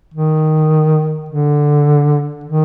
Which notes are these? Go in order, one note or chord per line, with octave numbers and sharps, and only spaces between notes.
D#3
D3
D#3